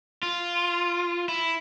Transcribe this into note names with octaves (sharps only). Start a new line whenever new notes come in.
F4
E4